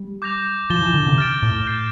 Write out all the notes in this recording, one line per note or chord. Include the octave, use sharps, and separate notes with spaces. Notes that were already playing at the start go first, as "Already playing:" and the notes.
Already playing: G3
D6 G6 A#6 F7
F3 A6 E7 G7
E3
D3
C3
F6 A6 D7
A2
G6 C7 E7 G7